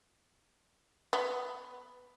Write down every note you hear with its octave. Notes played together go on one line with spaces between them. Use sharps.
B3